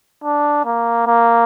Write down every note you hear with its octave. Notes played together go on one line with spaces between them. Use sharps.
D4
A#3
A#3